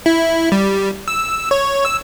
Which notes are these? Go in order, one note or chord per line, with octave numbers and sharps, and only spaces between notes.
E4
G3
E6
C#5
E6